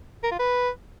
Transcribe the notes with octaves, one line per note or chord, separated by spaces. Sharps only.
A#4
F4
B4